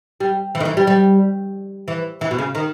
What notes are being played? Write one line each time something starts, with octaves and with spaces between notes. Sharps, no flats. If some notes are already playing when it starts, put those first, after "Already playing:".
G3
E3
D#3
E3
G3
G3
E3
E3
B2
C#3
D#3